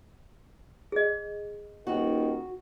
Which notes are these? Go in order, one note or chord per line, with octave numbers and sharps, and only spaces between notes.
G#4 D#5
D#1 D#3 F#4